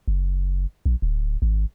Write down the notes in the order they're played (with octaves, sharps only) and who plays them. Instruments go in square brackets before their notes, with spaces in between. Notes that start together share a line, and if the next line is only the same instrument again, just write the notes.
[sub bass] F#1
A#1
D1
G#1